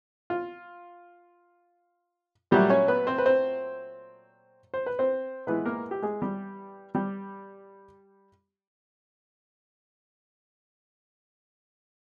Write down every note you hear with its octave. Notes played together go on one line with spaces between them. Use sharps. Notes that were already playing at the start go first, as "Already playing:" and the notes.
F4
A#2 F#3 G3 A3 G4
C#4 C#5
B3 B4
C4 C5
B4
C4 C5
C5
B4
C4 C5
A2 E3 G#3 B3 B4
A#3 A#4
G4
G#3 G#4
G3 G4
G3 G4